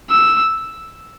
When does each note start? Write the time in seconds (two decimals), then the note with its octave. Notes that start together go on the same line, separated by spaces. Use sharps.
0.11 E6